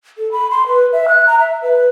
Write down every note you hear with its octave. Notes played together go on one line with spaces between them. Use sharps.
A4
B5
C6
B4
E5
F#6
A#5
E5
B4